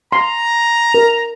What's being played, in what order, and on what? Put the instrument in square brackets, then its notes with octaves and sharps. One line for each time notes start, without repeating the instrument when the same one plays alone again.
[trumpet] A#5 [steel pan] C6
[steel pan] A#4